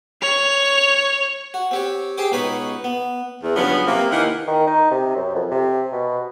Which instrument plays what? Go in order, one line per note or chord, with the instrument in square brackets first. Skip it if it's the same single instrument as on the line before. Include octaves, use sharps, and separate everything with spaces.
[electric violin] C#5 [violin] F7
[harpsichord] F#4
C4 G4 C#5
G4 G#4 C5 G5 D6
C#2 B2 D#4 B4 C#5 B5
B3
[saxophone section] E2
G2 C#3 F3 F#3 B3
C3 A#3
D#2 E3 A#3 D#4 F5 F#5
[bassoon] D#3
D#4
C3
F#2
F2
C3
B2